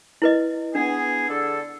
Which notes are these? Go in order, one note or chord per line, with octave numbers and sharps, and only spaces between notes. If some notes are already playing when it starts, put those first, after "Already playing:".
E4 B4 D#5
B3 D4 G#4
D3 G#4 A4